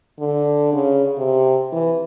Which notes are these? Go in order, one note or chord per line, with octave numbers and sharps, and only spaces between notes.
D3
C#3
C3
E3